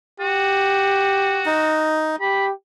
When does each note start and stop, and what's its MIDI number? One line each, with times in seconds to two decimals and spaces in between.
0.20 2.03 66
0.20 1.50 67
1.46 2.16 63
2.21 2.52 67
2.21 2.46 83